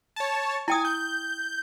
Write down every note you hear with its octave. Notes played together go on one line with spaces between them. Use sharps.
C#5 A5
E4 G5 G#5 D#6
G6